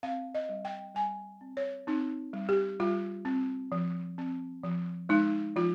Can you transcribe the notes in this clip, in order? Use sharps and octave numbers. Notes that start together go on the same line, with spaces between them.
C4 F5
D#5
G3
G5
G3 G#5
C4
C#5
C4 D#4
G3
G4
G3 F4
C4
F3
C4
F3
G#3 D#4
F3 F4